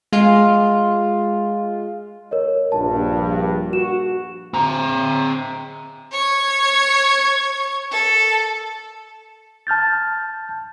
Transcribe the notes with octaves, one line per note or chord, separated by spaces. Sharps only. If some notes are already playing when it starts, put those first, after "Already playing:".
G#3 F4
A#4 C#5 D#5
A#1 G2 A5
F#4 E7
C4 A#5
C#5 G#6
A4
A5 F6 G6 A6